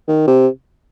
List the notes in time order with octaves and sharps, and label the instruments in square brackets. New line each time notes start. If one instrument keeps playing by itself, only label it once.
[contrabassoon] D#3
C3